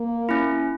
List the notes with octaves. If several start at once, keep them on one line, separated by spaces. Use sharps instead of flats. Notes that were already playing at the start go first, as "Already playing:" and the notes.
Already playing: A#3
C#4 E4